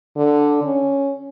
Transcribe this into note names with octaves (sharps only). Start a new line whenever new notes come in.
D3
C#4